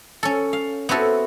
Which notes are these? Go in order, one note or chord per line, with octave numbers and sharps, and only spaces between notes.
C#4 A4
F5
B3 C4 E4 F#4 A4